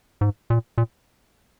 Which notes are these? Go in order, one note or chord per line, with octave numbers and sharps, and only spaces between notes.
G#2
A#2
A#2